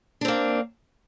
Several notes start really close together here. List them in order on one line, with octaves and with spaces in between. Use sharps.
D4 C4 A#3